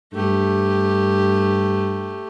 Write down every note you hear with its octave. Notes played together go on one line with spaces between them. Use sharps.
G2 A3 G4